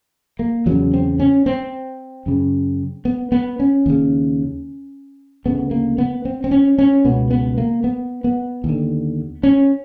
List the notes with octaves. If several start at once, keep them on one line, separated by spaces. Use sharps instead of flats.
A#3
E2 C#3 F#3
C4
C#4
C4
F#2 C#3
B3
B3
C#4
D#2 C#3
D2 C#3 B3
A#3
B3
C4
C4
C#4
C#4
C#2 B2 B3
B3
A#3
B3
B3
D#2 D3
C#4